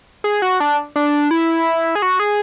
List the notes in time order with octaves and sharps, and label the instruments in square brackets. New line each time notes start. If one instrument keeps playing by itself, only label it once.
[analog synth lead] G#4
F#4
D4
D4
E4
G#4
F#4
G#4